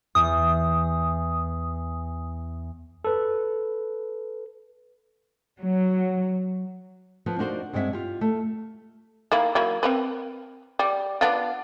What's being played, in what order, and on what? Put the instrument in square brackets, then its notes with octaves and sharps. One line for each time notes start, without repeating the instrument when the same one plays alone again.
[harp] E2 [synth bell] D#6
[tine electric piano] A4 B4
[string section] F#3
[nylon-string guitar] F3 B3
D4 D#4 F4 F#4 A#4 C5
G2 G#3 C4 D4 E5 F#5
F4 G4
A3
[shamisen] D#3 A#3 E4
F#3 A#3 E4
C4 A#4 B4
G3
B3 D4 F4